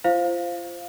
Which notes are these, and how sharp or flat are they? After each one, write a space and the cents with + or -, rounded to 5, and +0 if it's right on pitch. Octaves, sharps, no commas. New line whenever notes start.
F4 -30 C5 +0 F5 +0